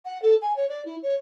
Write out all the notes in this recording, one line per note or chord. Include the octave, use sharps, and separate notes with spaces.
F#5
A4
G#5
C#5
D5
E4
C#5